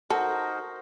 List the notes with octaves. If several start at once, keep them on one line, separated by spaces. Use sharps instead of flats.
D#4 F#4 A4 A#4 C5